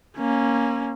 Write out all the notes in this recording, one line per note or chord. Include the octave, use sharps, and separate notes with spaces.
A#3 C#4